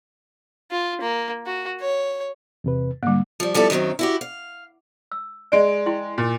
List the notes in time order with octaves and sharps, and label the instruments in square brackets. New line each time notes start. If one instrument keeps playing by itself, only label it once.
[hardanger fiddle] F4
A#3
F#4
C#5
[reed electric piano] E2 C3 B4
[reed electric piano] G#2 D3 [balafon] G3 A#3
[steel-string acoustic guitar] F3 G3
F3 G3 B3 E4 A4
F#2 D#3 E3 F#3 C4
E4 F#4 G4
F5
[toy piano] E6
[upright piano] G#3 D7 [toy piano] D5 D#5
[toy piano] E4 G5 C6
[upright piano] A#2